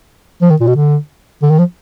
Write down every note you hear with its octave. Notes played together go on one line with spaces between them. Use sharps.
F3
D#3
A#2
B2
D3
D3
D#3
F3